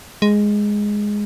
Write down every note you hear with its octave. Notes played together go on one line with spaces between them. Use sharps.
G#3